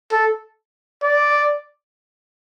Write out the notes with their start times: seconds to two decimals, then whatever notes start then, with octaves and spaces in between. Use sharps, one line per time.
0.12 A4
1.03 D5